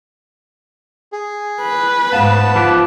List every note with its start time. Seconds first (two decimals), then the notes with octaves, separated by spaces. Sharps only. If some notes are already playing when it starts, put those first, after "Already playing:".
1.12 G#4
1.62 B4
2.12 G#2 A3 B3 F5 A5
2.56 F3 G4 B4